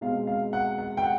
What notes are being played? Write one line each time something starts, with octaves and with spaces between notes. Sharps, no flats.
B2 G#3 C4 F5
F5
F#5
F#5
G5
F#5